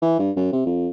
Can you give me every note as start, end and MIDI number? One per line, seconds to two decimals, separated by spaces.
0.02 0.18 52
0.19 0.31 43
0.36 0.48 42
0.52 0.62 48
0.66 0.89 41